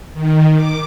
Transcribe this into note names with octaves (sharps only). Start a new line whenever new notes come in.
D#3
D6